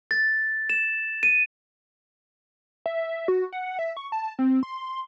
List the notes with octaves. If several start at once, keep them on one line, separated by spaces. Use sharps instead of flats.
A6
E7
D#7
E5
F#4
F#5
E5
C#6
A5
C4
C6